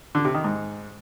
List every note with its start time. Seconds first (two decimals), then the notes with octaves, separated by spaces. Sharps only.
0.15 D3
0.25 C3
0.34 D#3
0.44 G#2